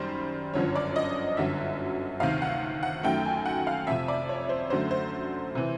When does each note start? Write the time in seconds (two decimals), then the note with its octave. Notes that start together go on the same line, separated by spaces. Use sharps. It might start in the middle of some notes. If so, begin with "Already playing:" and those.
Already playing: F#2 D#3 G3 C5
0.54 G1 F#2 D3 F3 C#5
0.75 D5
0.96 D#5
1.37 G1 F#2 D3 F#3 E5
2.20 D2 C3 D#3 F5
2.42 F#5
2.83 F#5
3.03 F#2 D#3 F#3 A3 G5
3.25 G#5
3.46 F#5
3.67 F5
3.87 F2 C3 F3 E5
4.08 D5
4.29 C#5
4.49 C5
4.70 F#2 D3 F#3 A3 C5
4.91 C5
5.55 C3 E3